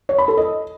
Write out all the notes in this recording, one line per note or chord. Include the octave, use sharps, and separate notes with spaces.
C#5
B5
A4
D#5